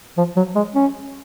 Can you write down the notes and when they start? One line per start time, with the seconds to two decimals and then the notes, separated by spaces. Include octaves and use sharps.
0.17 F3
0.36 F#3
0.56 G#3
0.75 C#4